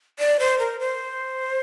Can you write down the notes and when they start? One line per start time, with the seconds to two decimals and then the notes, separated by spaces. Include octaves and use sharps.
0.19 D5
0.40 C5
0.59 A#4
0.80 C5